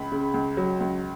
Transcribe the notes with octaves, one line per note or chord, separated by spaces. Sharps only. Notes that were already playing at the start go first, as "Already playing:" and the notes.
Already playing: C#2 B5
C#3
C#2
F#3
C#2